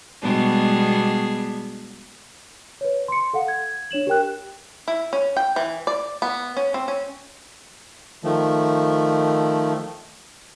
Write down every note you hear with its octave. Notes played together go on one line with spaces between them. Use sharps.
B2 G3 G#3 B3 D4 G#4
B4 C#5
C6 C#7
A4 F5 F#5
G#6
D4 C#5 E7 F#7
G4 A#4 G5 F#6
E4
C#4
G5
E3
D5
B3
C#4
C4
C#4
D#3 F3 A3